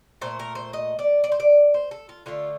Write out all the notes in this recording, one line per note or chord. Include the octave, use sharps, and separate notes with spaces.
A#2 A3 C5
A#4
C5
D#5
D5
D5
C5
D5
C5
A4
F4
D3 A3 F4